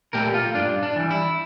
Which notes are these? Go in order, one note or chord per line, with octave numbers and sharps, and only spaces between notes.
A#2 A3 G4 A#4
F4 A4
G2 D4 F4
D4
E3 G3
E4